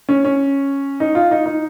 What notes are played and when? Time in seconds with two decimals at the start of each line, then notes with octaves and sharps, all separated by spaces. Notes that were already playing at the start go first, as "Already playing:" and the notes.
0.09 C#4
0.25 C#4
1.00 D#4
1.15 F4
1.31 D#4
1.46 D#4